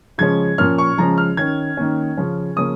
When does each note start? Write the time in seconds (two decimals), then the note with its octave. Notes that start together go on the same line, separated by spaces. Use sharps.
0.18 C#3 F3 G#3 C#4 G#6
0.58 A#2 F3 A#3 C#4 F6
0.78 C#6
0.97 C#3 F3 G#3 C#4 A#5
1.18 F6
1.37 D#3 C#4 G#6
1.77 D#3 A#3 C#4
2.17 C#3 F3 C#4
2.56 C#3 F3 A#3 C#4 D#6